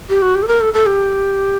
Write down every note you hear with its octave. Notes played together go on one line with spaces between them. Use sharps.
G4
F#4
G4
A4
A#4
A4
A4
G4